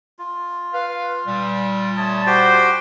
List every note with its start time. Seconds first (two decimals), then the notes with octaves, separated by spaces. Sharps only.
0.19 F4
0.73 B4 F5
1.27 A#2 G3
1.97 A3 C#5 A5 D#6
2.27 F#4 G4 C5 G5